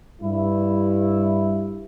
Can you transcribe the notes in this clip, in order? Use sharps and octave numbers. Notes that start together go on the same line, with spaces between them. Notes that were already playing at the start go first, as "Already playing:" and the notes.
G2 E4